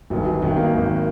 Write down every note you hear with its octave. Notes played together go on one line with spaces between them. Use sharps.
G1 F#2 D#3 F#3
F#3
G1 F#2 D#3 F#3
A#3
G#1 F#2 D#3